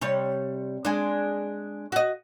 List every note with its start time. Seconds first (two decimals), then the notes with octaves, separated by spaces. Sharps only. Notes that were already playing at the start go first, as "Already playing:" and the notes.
0.01 C3 G3 C#5
0.85 G#3 D4
1.92 F#4 D#5